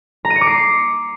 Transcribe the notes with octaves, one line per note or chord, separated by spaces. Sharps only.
A#5
D#7
C#7
D6
C7